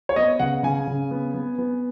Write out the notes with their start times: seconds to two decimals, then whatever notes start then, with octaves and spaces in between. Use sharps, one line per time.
0.09 C#5
0.16 B3 D#5
0.39 C#3 F#5
0.63 C#3 G#5
0.87 C#3
1.11 B3
1.34 B3
1.58 B3